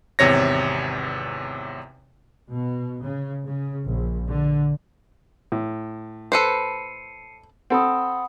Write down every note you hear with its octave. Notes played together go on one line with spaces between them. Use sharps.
G#1 E2 C3 C#5 A#6
B2
C#3
C#3
A#1
D3
A2
A4 B4 C5 C7 C#7 D#7
C4 A4 F#5 B5 D#6